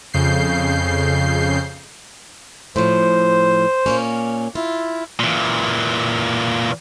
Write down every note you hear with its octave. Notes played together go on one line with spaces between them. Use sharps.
F2 C#3 G6 C7
A2 F3 C5
A#2 A#3 C#4
E4 F4
A#2 E3